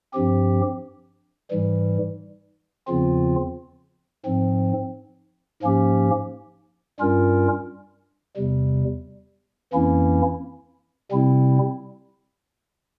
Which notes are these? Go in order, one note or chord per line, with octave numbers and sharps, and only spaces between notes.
G2 F3 C4 G4
G#2 E3 G3
E2 C#3 F3 C4 F4
G#2 F3 C4
G#2 F3 A#3 C#4 G4
G2 G3 C#4 F4 A#4
E2 C3 G3
F2 E3 A#3 C#4 E4
C3 G3 C4 E4